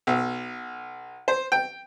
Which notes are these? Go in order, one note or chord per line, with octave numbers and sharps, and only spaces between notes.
B1
C5
G5